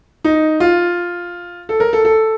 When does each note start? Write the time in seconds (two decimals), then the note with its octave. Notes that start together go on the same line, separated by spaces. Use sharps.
0.24 D#4
0.60 F4
1.69 A4
1.80 A#4
1.93 A4
2.05 A4